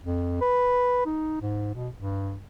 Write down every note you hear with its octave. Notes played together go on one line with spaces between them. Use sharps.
F2
B4
D#4
G#2
B2
G2